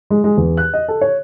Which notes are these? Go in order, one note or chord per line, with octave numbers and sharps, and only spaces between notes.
G#3
G#3
E2
F#6
D#5
A4
C#5